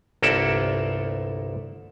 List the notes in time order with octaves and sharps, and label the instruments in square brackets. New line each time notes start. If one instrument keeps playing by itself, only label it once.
[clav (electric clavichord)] G1 C2 A#3 A4 D5 E5